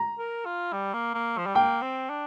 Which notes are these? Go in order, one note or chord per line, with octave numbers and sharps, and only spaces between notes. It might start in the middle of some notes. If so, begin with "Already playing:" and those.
Already playing: A#5
A#4
F4
G3
A#3
A#3
F3
G3
A#3 G5
C4
D4